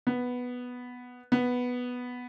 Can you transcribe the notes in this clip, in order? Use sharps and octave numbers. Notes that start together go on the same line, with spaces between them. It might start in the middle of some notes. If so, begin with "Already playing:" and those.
B3
B3